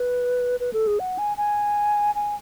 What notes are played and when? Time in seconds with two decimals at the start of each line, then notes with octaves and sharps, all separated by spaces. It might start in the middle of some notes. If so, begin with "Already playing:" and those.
Already playing: B4
0.60 B4
0.73 A4
0.87 G#4
1.00 F#5
1.18 G#5
1.37 G#5
2.15 G#5